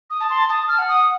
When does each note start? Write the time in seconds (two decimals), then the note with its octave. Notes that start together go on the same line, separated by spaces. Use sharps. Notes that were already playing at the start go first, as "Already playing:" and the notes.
0.10 D#6
0.20 A5
0.30 C6
0.49 A5 D#6
0.68 F6
0.78 F#5
0.88 D#6